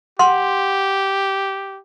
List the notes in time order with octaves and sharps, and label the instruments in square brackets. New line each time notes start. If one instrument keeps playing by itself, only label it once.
[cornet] G4 [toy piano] F#5 C6